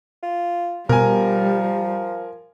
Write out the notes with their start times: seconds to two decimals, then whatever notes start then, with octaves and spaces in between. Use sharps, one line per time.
0.23 F4
0.89 B2 F3 G3 A#4 G#5